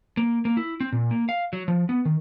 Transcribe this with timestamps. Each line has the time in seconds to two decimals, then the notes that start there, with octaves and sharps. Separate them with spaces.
0.17 A#3
0.45 A#3
0.57 E4
0.80 C4
0.92 A#2
1.11 A#3
1.29 F5
1.53 F#3
1.68 F3
1.89 B3
2.05 D#3